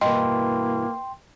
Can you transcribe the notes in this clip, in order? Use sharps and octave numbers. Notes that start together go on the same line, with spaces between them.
G2 B2 E3 A#3 D#5 G5 C6